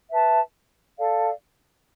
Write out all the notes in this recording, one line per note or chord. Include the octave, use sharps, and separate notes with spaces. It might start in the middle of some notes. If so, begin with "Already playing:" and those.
B4 E5 A5
A4 D5 F5